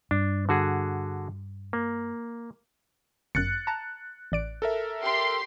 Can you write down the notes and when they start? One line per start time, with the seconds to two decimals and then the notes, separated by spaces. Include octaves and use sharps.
0.11 G2 D4
0.49 D3 F#4 G#4
1.73 A#3
3.35 G1 F#2 F#6 A6 C#7
3.67 A5 A#5
4.32 A1 D5 D7
4.62 A4 A#4 E5
5.02 G4 C6